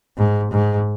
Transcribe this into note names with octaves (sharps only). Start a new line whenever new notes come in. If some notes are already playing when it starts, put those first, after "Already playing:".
G#2
G#2